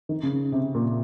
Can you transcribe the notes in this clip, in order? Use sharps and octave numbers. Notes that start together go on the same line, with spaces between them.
D#3
C#3
C3
A#2